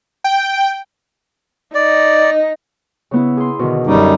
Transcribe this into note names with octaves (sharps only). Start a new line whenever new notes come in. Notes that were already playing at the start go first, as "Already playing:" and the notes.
G5
D#4 D5
C#3 B3 E4
G#4 C6
B2 D3 D#3
F#2 D3 G3 C#4 D#4